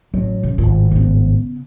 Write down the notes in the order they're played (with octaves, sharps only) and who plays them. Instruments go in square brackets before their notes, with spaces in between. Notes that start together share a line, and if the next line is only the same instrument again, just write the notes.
[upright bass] A1 [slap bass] F#3
[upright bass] C#3
[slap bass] G#1 A2 [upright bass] F4
[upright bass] C#3 B3